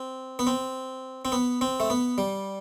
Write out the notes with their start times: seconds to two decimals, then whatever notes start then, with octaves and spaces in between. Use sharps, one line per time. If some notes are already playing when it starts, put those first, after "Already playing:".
Already playing: C4
0.39 B3
0.47 C4
1.25 C4
1.32 B3
1.61 C4
1.80 A3
1.90 B3
2.18 G3